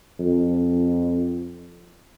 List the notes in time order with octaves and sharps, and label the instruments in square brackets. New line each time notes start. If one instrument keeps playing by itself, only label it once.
[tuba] F2